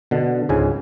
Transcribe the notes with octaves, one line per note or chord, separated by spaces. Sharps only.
B2 D3
C#2 G#2 C#3 G#5